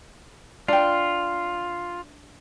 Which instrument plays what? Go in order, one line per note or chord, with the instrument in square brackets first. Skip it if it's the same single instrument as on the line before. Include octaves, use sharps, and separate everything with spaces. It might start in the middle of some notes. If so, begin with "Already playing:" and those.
[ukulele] D4 G5 [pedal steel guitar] F4